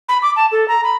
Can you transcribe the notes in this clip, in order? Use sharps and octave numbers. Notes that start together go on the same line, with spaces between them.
B5
D6
A5
A4
A#5
B5